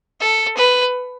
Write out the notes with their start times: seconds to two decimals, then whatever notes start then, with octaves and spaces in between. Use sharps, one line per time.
0.20 A4
0.57 B4